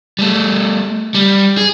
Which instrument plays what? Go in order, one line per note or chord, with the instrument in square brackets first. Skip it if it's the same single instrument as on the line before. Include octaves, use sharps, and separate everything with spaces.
[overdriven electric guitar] G3 A3
G3
G#4